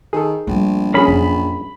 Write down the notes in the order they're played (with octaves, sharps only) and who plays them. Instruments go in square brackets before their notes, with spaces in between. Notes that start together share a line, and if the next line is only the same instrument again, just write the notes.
[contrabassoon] D#3 [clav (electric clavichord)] G#4 A4
[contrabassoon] A#1 [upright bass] G3 A3
[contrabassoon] A#1 [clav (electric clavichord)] C#4 G#4 [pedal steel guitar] A#4 B5
[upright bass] F2 F#3 [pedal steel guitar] B5